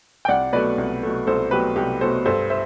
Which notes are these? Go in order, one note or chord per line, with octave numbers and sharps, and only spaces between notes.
G5
C2 D5 F#5
B2 F#3 A3 B4 D5
C2
B2 F#3 A3
C2 A4 C5
B2 F#3 A3 G4 B4
C2 G4
B2 F#3 A3 A4 C5
G2 A4 C5
C5 E5